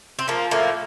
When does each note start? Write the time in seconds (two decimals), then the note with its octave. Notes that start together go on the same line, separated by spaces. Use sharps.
0.19 C4
0.28 F3 A#3
0.51 A2 A#3